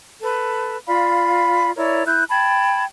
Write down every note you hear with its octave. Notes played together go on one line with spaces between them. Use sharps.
A4 B4
F4 D5 F5 B5
E4 A#4 C#5 D5
E4 F#6 G6
G5 A5 B5 G#6